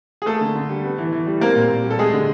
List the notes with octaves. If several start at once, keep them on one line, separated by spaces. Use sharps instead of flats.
G#4
A3 A#3 A4
D3
D3
G3
B3
E3
E3
G3
A#3 C4 A#4
A#2
A#2
G3
A4
G#3 A3 G#4
D3